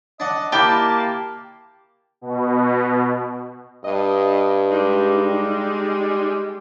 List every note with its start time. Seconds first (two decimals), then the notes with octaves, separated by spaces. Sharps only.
0.20 D4 D#5 F#5
0.52 A#3 E4 G4 D5 A5
2.21 B2
3.85 G2 D#5
4.71 G3 G#3 D#4